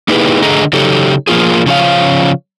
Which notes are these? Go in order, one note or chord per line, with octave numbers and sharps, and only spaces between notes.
A#3 D#4 E4 G4 G#4 B4
D3 A3 G#4 D#5 A#5
C#3 F#3 D#4 G4 A4
F3 A#3 B3 F4 G#4
C#3 F3 C#4 F5